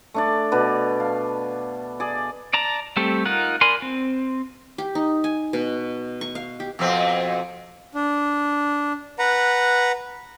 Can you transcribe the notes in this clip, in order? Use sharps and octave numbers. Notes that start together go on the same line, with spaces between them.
A3 D4 D5
B2 D4 B4
F5
G#4 D5
D5 A5 A#5
G3 A3 C4 G4 A4
D#4 F4 A#4 F#5
A#4 D5 G#5 B5 C6
C4
G4
D#4
G#5
B2
C#6
F5
G4
F2 B2 C4
D4
B4 F#5 A#5